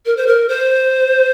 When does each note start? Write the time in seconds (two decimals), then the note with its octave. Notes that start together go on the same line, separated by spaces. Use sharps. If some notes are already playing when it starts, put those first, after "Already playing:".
0.06 A#4
0.17 C5
0.27 A#4
0.49 C5